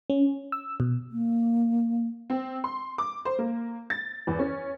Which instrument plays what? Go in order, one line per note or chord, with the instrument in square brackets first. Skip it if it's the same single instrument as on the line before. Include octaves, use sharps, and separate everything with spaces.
[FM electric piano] C#4
E6
B2
[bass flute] A#3
[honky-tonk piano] C4
C6
D6
C5
A#3
A6
E2
C#4